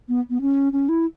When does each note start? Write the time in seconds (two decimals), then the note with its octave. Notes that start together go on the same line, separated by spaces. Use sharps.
0.09 B3
0.30 B3
0.41 C#4
0.73 C#4
0.89 E4